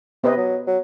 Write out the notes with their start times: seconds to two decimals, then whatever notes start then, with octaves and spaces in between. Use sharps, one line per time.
0.24 C3 B3 B4 D#5
0.37 F#3
0.67 F#3